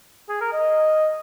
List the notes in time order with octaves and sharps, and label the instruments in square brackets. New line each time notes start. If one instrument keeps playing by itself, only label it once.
[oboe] G#4
A#4
D#5